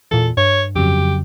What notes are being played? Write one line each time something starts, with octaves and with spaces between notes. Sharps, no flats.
E2 A#2 A4
G2 C#5
F2 C#3 F#3 G4